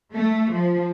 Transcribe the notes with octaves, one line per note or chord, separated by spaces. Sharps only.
A3
F3